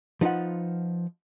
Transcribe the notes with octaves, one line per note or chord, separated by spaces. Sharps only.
F3 D#4 F4 B4 F#5